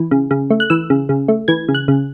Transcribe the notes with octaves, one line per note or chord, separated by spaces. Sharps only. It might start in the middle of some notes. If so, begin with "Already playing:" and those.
Already playing: E3
C#3
C#3
A3
F#6
E3 E6
C#3
C#3
A3
E3 G#6
C#3
F#6
C#3